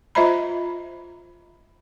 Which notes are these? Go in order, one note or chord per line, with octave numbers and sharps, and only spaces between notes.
F4 C5 D#5 E5 A#5 B5